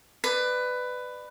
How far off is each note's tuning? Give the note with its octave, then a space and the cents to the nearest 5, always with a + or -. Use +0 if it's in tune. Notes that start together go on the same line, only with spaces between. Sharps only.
B4 +15 D5 +30